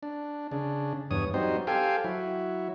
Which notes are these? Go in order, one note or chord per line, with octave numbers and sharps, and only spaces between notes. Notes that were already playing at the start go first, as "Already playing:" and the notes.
D4
C#3 D4
E2 G2 C#5 D#6
F#3 G3 C4 D#4 C5
G4 A4 C5 F5 G5 G#5
F#3 E4